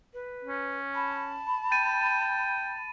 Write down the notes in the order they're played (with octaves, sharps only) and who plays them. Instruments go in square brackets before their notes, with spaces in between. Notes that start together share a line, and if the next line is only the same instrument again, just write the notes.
[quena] B4
[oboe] C#4
[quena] A5 [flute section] B5
[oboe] G5 [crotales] A6 D#7